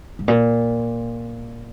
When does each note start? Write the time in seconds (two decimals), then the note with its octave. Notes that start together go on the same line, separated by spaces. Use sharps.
0.19 G#2
0.28 A#2